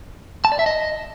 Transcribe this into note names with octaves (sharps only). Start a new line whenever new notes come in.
A5
D5
E5
D#5